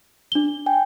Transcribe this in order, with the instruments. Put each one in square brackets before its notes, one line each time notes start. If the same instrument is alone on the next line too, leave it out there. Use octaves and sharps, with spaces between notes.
[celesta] D4 G7
[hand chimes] G5 G#5